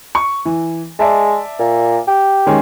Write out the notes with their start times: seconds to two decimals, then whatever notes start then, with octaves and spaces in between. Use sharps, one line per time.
0.15 C#6
0.45 E3
0.99 G#3 D5 E5 A5
1.59 A#2
2.08 G4
2.46 D#3 G#3 C#4